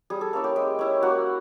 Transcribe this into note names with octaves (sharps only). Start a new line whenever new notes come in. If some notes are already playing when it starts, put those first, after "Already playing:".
G3 G#4
A4
A#3 C#4 E4 A4
G4
G#3 G4
C#4 E4
A#3 F#4